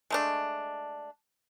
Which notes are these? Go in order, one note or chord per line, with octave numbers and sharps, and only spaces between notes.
G#3 A3 D4